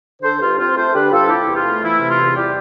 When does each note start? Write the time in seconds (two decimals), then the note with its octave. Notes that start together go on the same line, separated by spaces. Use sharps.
0.22 D3 A4 C5
0.40 G2 F4
0.58 C4 F4
0.76 A3 A4 C5
0.93 D3 G4 B4
1.11 G2 F4 A4
1.28 C3 E4 G4
1.46 E2
1.55 F4
1.65 A3
1.82 E3 E4
1.99 C3
2.08 F4
2.18 E2
2.35 G3 E4 G4